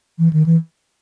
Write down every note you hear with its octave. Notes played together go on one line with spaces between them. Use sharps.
E3
D#3
E3